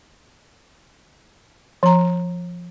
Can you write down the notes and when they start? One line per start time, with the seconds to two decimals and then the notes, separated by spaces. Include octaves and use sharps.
1.83 F3 A#5